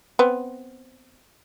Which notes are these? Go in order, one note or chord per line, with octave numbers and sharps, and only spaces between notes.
B3 C4